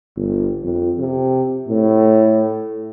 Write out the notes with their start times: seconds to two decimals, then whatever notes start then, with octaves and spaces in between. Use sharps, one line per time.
0.17 G1
0.63 F2
0.99 C3
1.68 A2